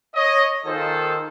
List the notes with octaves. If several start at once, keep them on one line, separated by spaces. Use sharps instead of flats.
C#5 D#5
D#3 A#3 F4 G#4 A4 C5